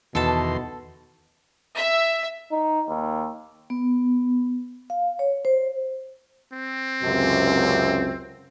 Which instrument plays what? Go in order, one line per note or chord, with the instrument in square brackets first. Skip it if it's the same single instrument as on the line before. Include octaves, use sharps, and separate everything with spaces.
[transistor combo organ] E2 D#3 C6 [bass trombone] B2 [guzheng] A4 A5
[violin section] E5
[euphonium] D#4
D#2
[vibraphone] B3
F5
C#5
C5
[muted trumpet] C4
[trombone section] C#2 F#2 C3